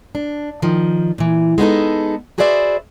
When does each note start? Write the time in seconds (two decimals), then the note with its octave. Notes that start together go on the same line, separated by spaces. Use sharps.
0.15 D4
0.62 D#3 F3
1.18 A#2 E3
1.58 G#3 B3 D#4 A4
2.38 F#4 G#4 B4 C5 D5 E5